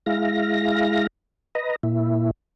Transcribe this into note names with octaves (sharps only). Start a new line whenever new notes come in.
G#3 E4 F5 A#6
B4 D#5 A#5
A#2 E4